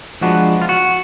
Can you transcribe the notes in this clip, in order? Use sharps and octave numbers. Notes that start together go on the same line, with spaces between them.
F3 G#3 B3 D4 F#4
F4
F#4